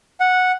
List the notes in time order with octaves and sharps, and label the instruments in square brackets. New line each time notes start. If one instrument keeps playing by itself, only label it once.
[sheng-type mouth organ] F#5